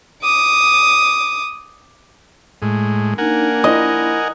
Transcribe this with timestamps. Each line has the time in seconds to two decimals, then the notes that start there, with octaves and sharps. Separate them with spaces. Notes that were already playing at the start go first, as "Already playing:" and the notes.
0.23 D6 D#6
2.62 A2 G#3
3.18 A#3 D4 D#4 A#4 F#5 G#5
3.64 E4 D#5